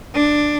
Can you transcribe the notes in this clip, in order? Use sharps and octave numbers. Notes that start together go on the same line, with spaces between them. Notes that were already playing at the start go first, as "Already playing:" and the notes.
D4